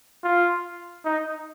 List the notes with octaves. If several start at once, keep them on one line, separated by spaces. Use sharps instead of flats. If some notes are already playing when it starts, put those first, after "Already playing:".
F4
D#4